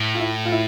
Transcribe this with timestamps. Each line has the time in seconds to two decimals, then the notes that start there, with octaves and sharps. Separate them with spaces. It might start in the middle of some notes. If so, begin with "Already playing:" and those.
Already playing: A2
0.15 F4
0.20 E4
0.45 F4
0.52 E4